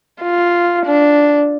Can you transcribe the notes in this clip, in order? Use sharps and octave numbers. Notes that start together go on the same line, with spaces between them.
F4
D4